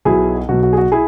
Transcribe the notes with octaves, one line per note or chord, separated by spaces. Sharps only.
B1 B2 F#3 E4 G#4
B1 B2 F#3 F#4
F#4
G#4
F#4
E4 G#4